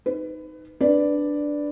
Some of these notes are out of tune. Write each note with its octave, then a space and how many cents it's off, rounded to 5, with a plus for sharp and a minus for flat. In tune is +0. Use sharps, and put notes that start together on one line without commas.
D#4 +0 B4 +25
D4 +0 B4 +0 D5 +0